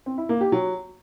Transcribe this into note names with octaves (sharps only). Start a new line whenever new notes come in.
C4
E4
A#3
G4
F#3